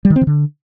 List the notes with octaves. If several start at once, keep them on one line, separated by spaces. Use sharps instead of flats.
G3
D#3
C4
D#3
D3